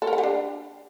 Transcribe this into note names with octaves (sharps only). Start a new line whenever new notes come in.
A4
A#4
F#5
G4
D4